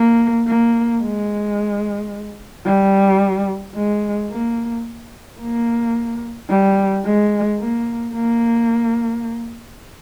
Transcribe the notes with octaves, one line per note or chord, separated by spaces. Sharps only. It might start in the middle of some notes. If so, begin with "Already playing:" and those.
Already playing: A#3
A#3
G#3
G3
G#3
A#3
A#3
G3
G#3
A#3
A#3